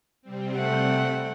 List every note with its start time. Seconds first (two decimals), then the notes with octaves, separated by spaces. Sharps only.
0.22 C3 G3 C4
0.57 A3 F#5